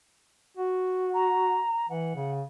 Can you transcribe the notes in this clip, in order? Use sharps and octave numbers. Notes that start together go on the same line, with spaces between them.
F#4
A#5
E3 F#5
C#3